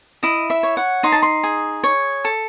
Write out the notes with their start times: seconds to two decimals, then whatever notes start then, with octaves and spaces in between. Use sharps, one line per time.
0.23 E4 D#5
0.50 E5
0.63 C#5
0.77 F#5
1.03 D#4 C6
1.12 A5
1.22 C6
1.43 G#4
1.84 C#5
2.25 A4